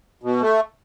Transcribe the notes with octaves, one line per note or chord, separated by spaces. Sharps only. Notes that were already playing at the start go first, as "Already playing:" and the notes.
B2
A3